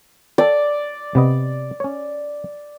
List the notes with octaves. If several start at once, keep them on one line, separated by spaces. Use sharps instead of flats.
A4 D5 G5
C3 B3 D#5
C#4 C#5